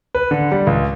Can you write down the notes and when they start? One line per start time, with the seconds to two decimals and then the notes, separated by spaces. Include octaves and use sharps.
0.15 B4
0.31 D3
0.52 G3
0.67 C#2